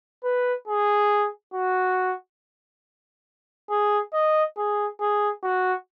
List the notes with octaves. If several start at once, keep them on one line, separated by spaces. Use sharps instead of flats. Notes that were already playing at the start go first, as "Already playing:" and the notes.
B4
G#4
F#4
G#4
D#5
G#4
G#4
F#4